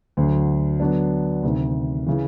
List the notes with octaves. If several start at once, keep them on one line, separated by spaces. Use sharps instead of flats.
D2 D3 F#3
D3 F#3 B3 D4
D2 C3 D#3
C#3 E3